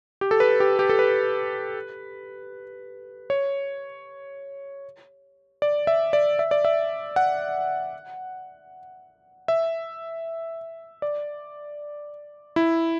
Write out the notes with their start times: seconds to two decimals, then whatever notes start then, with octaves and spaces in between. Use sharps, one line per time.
0.21 G4
0.31 A4
0.40 B4
0.60 G4
0.79 G4
0.89 A4
0.99 B4
3.30 C#5
5.62 D5
5.87 E5
6.13 D5
6.39 E5
6.51 D5
6.65 E5
7.16 F#5
9.48 E5
11.02 D5
12.56 E4